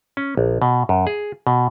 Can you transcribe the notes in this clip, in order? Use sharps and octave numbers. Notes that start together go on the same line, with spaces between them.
C#4
A#1
B2
F#2
G#4
B2